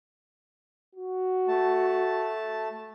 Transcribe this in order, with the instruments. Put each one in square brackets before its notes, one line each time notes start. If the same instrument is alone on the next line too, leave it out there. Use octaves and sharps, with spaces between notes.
[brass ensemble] F#4
[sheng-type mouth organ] A3 A5